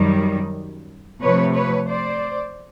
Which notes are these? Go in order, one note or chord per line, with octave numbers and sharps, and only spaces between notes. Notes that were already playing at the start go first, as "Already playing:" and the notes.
Already playing: F#2 D#3 G3
C3 F3 A3 B4 C#5
B4 C#5
C5 D5